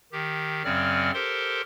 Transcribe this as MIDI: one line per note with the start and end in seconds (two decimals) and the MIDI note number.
0.12 0.63 51
0.12 0.63 67
0.64 1.11 42
0.64 1.11 49
0.64 1.11 54
0.64 1.11 60
0.64 1.11 74
0.64 1.11 89
1.14 1.62 67
1.14 1.62 69
1.14 1.62 70
1.14 1.62 72
1.14 1.62 84